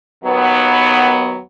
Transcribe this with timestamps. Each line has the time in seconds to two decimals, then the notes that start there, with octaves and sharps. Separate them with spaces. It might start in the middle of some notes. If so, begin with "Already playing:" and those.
0.25 D#2 D#3 F#3 B3